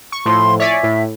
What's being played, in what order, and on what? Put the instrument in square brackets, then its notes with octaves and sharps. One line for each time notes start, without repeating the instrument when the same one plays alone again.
[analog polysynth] C#6
[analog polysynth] A2 F3 [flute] C6
[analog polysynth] C#5 D5 G#5 [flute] E5
[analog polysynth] A2